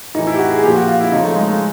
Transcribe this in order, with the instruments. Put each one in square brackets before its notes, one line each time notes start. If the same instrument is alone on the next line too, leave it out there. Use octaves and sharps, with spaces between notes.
[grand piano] A2 E3 D#4
E4
G4
F#4
G#4
A#2 F3 G4
F#4
F4
E4
C#3 F3 D#4
A3
G#3
A3